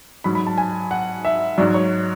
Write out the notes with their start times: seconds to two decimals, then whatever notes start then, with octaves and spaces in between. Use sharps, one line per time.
0.24 G#2 F#3 B5
0.35 B5
0.47 A5
0.58 G#5
0.91 F#5
1.25 E5
1.58 G#2 F#3 D5
1.74 C#5